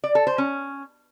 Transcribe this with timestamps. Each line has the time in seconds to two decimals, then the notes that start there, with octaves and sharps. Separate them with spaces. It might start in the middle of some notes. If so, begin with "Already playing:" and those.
0.04 D5
0.15 A4
0.27 C5
0.38 C#4